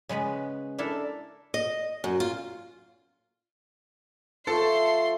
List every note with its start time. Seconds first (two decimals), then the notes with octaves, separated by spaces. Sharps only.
0.09 C#3 G#3 B3 B4
0.78 D4 E4 A4 A#4
1.54 D#5
2.04 F#2
2.20 F4
4.47 F3 A3 A4 A5 C6